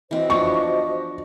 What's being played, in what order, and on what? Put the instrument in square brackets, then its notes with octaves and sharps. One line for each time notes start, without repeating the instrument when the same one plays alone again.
[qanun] E3 C4 [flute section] F#4 C5 D#5
[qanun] F3 B3 D4 [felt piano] C#6